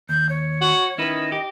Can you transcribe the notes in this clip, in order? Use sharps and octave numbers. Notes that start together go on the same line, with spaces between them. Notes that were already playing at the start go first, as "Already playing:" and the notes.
D#2 G6
C#5
F#4
D#3 C#4 E4 B4 D#5
G4